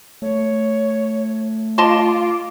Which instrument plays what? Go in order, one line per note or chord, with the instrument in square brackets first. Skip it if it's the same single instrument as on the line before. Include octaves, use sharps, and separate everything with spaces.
[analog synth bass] A3 [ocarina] C#5
[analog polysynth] F4 [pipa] D#5 A5 C6 [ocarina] D6